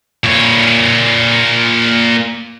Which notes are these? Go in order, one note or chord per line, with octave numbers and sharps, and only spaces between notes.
A#2 C#5